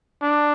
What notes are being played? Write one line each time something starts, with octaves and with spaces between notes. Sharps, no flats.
D4